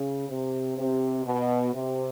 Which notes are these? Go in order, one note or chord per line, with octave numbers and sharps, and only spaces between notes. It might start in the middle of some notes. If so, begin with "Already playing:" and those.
Already playing: C#3
C3
C3
B2
C3